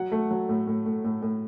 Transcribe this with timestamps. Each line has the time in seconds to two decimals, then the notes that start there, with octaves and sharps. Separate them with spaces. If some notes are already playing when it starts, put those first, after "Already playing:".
Already playing: F#3 F#5
0.12 A3
0.31 F#3
0.49 A2
0.67 A2
0.86 A2
1.04 A2
1.22 A2